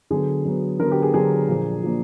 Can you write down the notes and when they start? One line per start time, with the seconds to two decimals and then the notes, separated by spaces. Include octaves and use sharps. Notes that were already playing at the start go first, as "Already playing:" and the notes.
0.11 D3 F#3 B3 G#4
0.45 D3 F#3 B3
0.80 D3 F#3 B3 A#4
0.91 G4
1.02 G#4
1.14 D3 F#3 B3 G#4
1.48 A#2 F3 A#3 D4
1.83 A#2 F3 A#3 D4